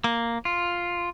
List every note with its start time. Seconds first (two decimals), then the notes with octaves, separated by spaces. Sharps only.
0.04 A#3
0.45 F4